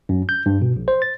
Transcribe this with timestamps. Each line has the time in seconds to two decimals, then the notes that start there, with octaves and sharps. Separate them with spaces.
0.09 F#2
0.29 G6
0.46 G2
0.62 B2
0.76 A#1
0.88 C5
1.02 A6